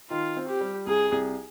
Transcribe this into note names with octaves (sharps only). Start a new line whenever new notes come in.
D#3 F4
C4
G4
G3
C2 G#4
C2